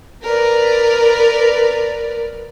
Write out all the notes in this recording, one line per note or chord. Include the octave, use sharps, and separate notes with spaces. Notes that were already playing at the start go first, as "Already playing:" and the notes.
A#4 B4 D5